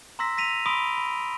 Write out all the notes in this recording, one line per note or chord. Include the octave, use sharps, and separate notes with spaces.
A#5 C6 E6 A#6 B6
A#6 B6 D#7 F7
B5 C6 D#6 B6 D7 G7
B5